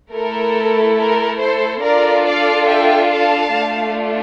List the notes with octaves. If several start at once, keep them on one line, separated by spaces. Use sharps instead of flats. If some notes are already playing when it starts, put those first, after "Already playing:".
A3 E4 A4 A#4
A#4
A4 C5
D4 F4 A4 A#4 D5
D5 F5
E5 G5
F5 A5
A3 D4 F4